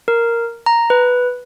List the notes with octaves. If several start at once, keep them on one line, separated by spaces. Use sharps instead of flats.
A#4
A#5
B4